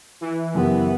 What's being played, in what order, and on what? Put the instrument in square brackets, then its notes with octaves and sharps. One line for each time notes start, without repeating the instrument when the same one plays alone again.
[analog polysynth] E3
[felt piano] F#2 [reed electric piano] C#3 G4 A#4 [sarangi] B3